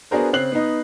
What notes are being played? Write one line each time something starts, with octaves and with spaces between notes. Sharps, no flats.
B3 D4 F#4 G#4 A#4 C5
C#3 C4 F#6 C7 F#7
B3 D#4